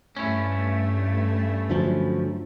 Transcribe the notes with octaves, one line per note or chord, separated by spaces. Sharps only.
G2 A3 C#4 E4
D3 F3 F#3